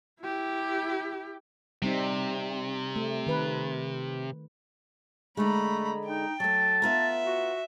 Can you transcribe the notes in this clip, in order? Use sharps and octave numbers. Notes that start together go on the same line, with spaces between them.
E4 G4
C3 G3 C4 D#4
A3
D#3 B4
D3 G#3 A3 A#5 B5
D#4 G5
F#3 A3 A5
B3 F4 E5 A#5
F#4